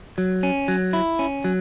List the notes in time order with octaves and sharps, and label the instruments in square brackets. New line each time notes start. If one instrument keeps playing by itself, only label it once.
[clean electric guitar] F#3
C#4
F#3
E4
C#4
F#3